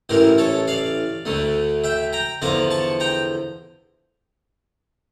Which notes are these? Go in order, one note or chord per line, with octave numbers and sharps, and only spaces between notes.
A1 A2 E3 G4 A#4
A4 C#5
D5 F5
D2 D3 A3
E5 G5
G5 A#5
E2 D3 F3 A#5 D6
A5 C#6
G5 A#5